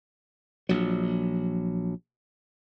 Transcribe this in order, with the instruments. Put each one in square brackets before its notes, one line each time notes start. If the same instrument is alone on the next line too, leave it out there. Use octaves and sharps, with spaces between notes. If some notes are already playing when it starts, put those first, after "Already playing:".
[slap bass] A#1 F#3